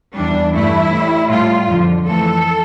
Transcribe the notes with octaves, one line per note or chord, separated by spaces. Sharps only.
E2 E3 G3 D4
G2 E3 A3 E4
A2 G3
A2 G3 F4
F2 D3 F3
F2 E3 A3 A4